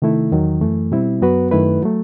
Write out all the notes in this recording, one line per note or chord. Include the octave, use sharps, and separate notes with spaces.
C3 D#3 A3 E4
E2 D#3 F#3
F#2 E3 A3
B2 G3 C4 E4
F#2 F#3 B3 F#4 B4
F#2 D#3 A3 E4 B4
F#3 A3